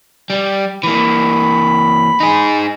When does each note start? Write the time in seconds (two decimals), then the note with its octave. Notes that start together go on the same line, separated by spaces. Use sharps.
0.30 G3
0.83 E3 A#3 B5
2.20 D#4 G#4